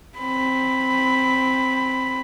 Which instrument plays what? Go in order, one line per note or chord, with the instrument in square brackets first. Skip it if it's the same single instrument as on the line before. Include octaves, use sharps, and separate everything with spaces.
[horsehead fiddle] C4 B5